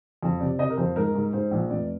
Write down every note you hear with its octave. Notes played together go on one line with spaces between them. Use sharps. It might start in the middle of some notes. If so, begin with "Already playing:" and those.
F2
C3 D5
C3 D#5
A#4
F2 C5
G#2 A#4
G#2
G#2 C5
A#1
F1 D5